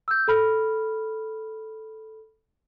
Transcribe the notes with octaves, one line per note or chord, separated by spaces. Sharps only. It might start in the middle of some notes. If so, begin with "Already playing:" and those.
E6 G6
A4 B5 F6